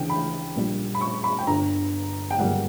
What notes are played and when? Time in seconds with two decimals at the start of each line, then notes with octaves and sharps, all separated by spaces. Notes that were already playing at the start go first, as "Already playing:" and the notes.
Already playing: D2 C#3 E3 G5
0.10 B5
0.56 A#1 A#2 G3
0.95 B5
1.01 C#6
1.24 B5
1.38 G5
1.47 G1 G2 D3 A#5
2.31 G5
2.39 G1 F#2 C#3 G3 A#3 F#5